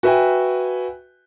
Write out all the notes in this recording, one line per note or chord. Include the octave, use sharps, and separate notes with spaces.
F#4 B4 E5 G5 G#5